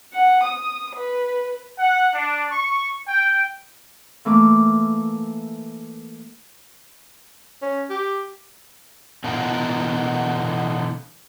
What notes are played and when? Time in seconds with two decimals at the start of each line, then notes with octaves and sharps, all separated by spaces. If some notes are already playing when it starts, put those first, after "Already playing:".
0.14 F#5
0.43 D#6
0.96 B4
1.79 F#5
2.14 D4
2.52 C#6
3.08 G5
4.25 E3 A3 A#3 D6
7.62 C#4
7.90 G4
9.24 B2 D3 E3 B3 F4 A#4